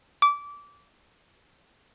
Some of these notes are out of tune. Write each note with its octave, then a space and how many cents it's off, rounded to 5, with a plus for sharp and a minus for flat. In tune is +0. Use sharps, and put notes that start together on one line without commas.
D6 -20